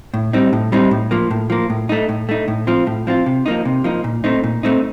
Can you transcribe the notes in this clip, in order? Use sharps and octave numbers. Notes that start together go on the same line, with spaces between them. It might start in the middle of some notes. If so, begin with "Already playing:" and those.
A2
G3 C4 D#4
A2
G3 C4 D#4
A2
F3 A#3
A2
F3 A#3
A2
A3 D#4
A2
A3 D#4
A2
F3 C4 F4
A2
F3 C4 F4
C3
F3 A#3 D#4
C3
F3 A#3 D#4
A#2
A3 C4 D#4
A#2
A3 C4 D#4